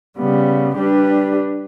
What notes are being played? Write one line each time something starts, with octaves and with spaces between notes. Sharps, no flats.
C#3 G3 B3
G3 D4 G4 B4